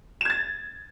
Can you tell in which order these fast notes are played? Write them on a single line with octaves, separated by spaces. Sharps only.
E7 G#6 A6